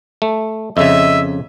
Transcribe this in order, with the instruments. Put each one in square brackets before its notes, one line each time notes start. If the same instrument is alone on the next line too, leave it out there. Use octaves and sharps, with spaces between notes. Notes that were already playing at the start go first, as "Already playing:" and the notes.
[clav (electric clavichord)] A3
[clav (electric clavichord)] F2 C#3 [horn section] D#5 E5